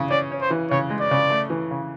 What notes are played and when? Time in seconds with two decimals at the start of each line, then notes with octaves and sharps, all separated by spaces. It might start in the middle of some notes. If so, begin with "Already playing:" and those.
Already playing: C#3 E3
0.10 C#4 D5
0.31 C#4
0.41 C5
0.50 E3
0.70 C#3 C#5
0.90 G#3
1.00 D5
1.11 C#3
1.30 A3
1.50 E3
1.71 C#3